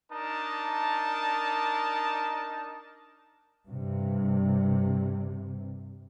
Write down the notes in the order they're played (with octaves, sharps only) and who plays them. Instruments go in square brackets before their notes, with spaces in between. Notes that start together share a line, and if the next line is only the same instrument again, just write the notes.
[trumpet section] D4 D#4 A#4 A5
[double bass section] G2 C3